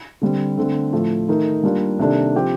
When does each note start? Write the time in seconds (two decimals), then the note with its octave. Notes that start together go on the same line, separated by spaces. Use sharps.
0.21 D3 G3 C4
0.57 D3 A3 C4
0.93 A2 F3 A3
1.28 D#3 A3 D#4 A#4
1.64 G3 A#3 D4 F4
1.99 C3 D#3 A#3 D4 A4
2.35 F3 C4 G4